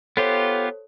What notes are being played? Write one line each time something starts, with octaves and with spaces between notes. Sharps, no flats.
B3 F4 G4 A4 C5 C#5